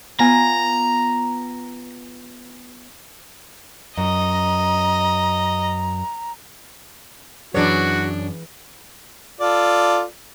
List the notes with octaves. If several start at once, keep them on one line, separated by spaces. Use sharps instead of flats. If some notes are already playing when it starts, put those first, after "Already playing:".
B3 F4 G#5 A#5
F#2 D#5 A#5
F#2 E3 D4 F#4 G#4 B4 C#5
F4 A4 D5